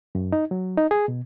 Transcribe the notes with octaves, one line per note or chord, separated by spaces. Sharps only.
F#2
D#4
F#3
D#4
G#4
B2